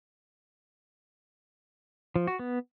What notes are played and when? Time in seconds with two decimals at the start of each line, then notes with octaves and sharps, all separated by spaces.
2.16 F3
2.27 F#4
2.39 B3